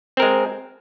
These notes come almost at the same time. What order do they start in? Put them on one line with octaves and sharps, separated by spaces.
C4 A#4 G#3